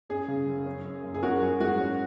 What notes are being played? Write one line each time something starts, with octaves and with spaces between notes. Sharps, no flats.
C#4 G#4
C#3
F#2
C#4
F#2
F#1
G#4
C#4 F#4 A#4
F#3 G#4
G#2 F#4
C#4